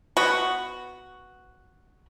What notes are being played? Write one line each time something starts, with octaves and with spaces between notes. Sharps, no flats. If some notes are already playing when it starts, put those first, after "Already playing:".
B3 F#4